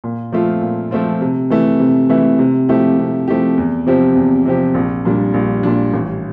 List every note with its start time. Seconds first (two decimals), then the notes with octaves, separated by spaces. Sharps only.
0.04 A#2
0.32 F3 A3 C4 F4
0.62 A#2
0.91 F3 A3 C4 F4
1.21 C3
1.50 E3 A3 E4
1.80 C3
2.10 E3 A3 E4
2.39 C3
2.68 F3 A3 E4 G4
2.99 C3
3.28 F3 A3 E4 G4
3.58 E2
3.87 C3 F3 C4 G4
4.15 E2
4.45 C3 F3 C4 G4
4.74 A#1
5.05 A#2 G3 D4
5.34 A#1
5.63 A#2 G3 D4
5.93 A1